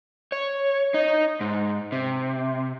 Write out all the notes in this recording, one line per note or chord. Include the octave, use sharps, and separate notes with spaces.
C#5
D#4
G#2
C3